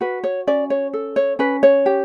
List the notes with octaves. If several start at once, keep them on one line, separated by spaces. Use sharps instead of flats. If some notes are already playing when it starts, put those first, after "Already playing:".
F#4 B4
C#5
C#4 D5
C#5
A4
C#5
C#4 B4
C#5
G4